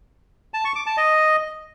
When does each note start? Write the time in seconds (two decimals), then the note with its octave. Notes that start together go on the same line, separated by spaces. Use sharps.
0.54 A5
0.65 C#6
0.76 D6
0.86 A5
0.97 D#5